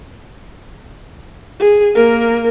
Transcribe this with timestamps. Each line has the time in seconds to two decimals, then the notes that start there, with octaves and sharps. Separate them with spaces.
1.60 G#4
1.95 A#3 A#4